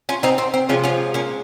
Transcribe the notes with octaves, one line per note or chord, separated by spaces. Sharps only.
C#4 F4
C4 D#4
C4
C4
C3 F3 G#3 C#4 F4
C#4 F4
A#3 C#4